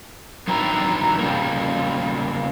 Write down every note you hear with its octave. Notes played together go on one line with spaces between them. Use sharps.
G2 D#3 F#3 B4 E5 A#5
C#3 G3 A#3